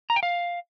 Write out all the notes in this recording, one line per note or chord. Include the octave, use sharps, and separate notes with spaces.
A#5
G5
F5